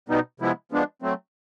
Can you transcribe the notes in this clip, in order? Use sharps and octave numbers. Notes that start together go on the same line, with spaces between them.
B2 G3 B3 D#4
C3 F3 G#3 B3 E4
F3 G#3 B3 D4
F#3 A3 C4